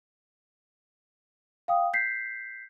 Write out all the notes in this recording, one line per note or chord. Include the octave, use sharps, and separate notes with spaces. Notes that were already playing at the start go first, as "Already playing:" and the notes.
F5 G5 D#6
G6 B6 C7